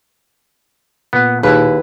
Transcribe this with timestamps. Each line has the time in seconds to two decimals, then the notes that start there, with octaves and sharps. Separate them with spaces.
1.13 A#2 B3
1.43 D#2 E4 G#4 B4